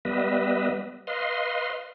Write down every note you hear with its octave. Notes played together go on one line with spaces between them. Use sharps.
G3 B3 B4 D#5 E5
B4 D#5 F5 C6